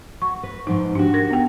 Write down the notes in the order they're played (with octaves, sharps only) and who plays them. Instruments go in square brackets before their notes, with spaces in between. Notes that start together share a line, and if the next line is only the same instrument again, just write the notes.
[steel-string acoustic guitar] F#4 [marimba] C#6
[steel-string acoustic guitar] B4
[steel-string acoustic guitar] G#2 F3 C4 [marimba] D#4
[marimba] D4 [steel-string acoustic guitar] F#4 G4
[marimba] A#4 A#6
B3 G5